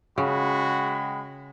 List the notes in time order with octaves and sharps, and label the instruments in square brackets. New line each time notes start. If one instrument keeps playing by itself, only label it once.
[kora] C#3 [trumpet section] G#3 G5 B5 [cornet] F#4